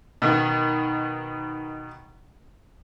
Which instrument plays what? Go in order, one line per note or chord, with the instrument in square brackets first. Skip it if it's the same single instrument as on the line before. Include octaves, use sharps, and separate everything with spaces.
[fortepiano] B2 D#3